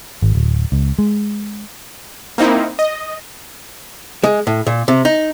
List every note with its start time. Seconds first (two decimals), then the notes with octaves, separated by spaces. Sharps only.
0.22 G#1
0.35 D1
0.72 C#2
0.99 G#3
2.38 A#3 C4 D#4 E4
2.79 D#5
4.23 G#3
4.47 A2
4.67 A#2
4.88 C3
5.05 D#4